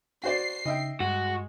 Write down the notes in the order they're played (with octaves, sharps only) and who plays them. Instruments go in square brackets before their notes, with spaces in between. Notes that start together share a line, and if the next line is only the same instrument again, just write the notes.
[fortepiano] F#4 C5 D5 [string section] C7
[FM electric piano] C#3 D#4 [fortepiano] D#5 E5 G5
[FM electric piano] G2 [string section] G#3 [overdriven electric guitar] F#4